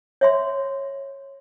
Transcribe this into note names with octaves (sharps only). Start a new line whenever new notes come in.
C#5 E5 C6